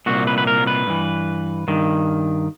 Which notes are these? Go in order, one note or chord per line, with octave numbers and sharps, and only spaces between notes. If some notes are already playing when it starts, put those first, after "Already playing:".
C2 A#2 F#4
B4
B4
A#4
B4
G2 E3
G2 D#3